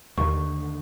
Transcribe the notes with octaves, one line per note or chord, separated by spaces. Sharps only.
D#2 D3 D#3 A3 C#6